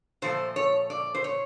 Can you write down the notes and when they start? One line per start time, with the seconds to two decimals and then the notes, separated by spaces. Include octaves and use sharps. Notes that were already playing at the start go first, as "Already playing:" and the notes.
0.22 A#2 F3 A3 C5
0.56 C#5
0.90 D5
1.14 C5
1.24 C#5